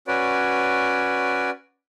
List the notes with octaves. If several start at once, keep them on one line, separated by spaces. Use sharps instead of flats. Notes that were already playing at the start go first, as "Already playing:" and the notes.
C#4 F#4 B4 C#5 D5